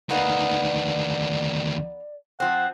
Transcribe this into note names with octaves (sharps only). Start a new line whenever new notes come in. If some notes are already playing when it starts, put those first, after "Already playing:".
D2 D#3 A#3 B3 D#4 D5
F3 C4 F#5